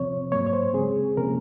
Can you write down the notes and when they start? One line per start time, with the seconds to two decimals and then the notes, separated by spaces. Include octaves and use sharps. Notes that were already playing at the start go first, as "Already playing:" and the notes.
Already playing: C3 F3 C4 C#5
0.32 G#2 F#3 A#3 C#5
0.46 C#5
0.53 C5
0.74 C#3 G#3 C4 G#4
1.17 C3 F3 A#3 C#4 A#4